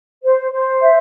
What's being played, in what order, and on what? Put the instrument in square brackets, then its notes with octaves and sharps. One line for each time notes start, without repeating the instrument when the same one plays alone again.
[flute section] C5
C5
E5